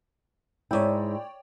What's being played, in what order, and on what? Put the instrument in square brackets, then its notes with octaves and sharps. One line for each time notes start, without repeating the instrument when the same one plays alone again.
[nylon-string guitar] G#2 E4 [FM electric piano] C#5 D5 G5